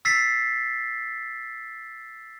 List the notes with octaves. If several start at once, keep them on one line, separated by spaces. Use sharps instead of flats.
E6 A6 B6 C7